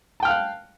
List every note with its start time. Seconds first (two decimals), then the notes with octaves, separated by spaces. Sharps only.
0.20 A5
0.23 G5
0.25 F6
0.28 F5
0.30 F#6